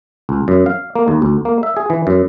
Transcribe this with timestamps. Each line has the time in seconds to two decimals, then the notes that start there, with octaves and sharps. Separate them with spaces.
0.29 C#2
0.48 F#2
0.66 F5
0.96 A#3
1.08 D#2
1.22 D2
1.45 A#3
1.63 E5
1.77 G#4
1.90 E3
2.07 F#2